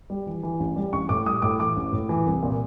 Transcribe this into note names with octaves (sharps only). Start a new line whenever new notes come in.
G3
E3
E3
A1
G3
A1 C#6
A2 D6
G3 D#6
A2 D6
E3 D6
A1
A2
E3
C2
A#2